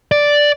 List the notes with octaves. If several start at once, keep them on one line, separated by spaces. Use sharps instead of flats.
D5